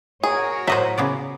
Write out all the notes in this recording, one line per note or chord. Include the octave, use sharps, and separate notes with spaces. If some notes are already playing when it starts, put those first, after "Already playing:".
F#4 G#4 A#4 C#5
A2 F#3 C5 D#5 E5
C#3 B3 D5